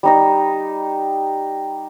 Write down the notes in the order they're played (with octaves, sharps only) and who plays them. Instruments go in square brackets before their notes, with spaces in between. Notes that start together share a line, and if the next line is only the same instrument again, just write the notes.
[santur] G3 D#4 D#5